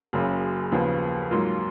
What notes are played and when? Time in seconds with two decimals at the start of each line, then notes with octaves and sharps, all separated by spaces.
0.13 F#1 F#2 C#3 F#3
0.72 D#2 C#3 F3 B3
1.31 G#2 F#3 A#3 F4